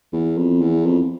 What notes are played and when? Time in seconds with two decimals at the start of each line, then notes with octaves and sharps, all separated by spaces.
0.13 E2
0.37 F2
0.61 E2
0.85 F2